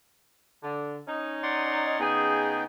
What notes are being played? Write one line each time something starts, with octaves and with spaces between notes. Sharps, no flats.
D3
C#4 D#4
D5 F#5 C6
C#3 B3 D#4 G#4 G5